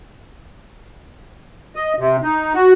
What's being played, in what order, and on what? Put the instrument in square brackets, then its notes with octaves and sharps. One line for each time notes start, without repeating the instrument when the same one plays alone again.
[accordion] D#5
C3
D#4
F#4